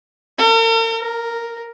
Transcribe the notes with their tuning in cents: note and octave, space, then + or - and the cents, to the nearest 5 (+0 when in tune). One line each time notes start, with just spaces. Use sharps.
A#4 -45
A#4 +0